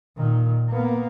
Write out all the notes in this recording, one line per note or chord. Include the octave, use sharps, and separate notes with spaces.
A#2 D#3
A#3 B3